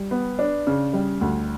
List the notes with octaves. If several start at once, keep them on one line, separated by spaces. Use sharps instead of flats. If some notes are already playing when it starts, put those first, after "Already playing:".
Already playing: G3
B3
D4
C#3
G3
D2